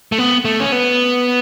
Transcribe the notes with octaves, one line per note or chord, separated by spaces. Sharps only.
A3
B3
A3
C#4
B3